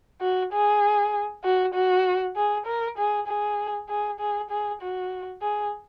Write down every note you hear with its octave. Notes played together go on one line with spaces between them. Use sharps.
F#4
G#4
F#4
F#4
G#4
A#4
G#4
G#4
G#4
G#4
G#4
F#4
G#4